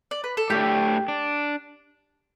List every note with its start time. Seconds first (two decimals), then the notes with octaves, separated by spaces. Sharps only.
0.11 D5
0.24 B4
0.37 A4
0.50 A2 A3 D4 G4
1.08 D4